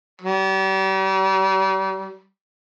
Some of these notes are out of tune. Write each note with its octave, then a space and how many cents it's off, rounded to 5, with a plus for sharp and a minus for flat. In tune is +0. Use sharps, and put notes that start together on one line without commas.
G3 -40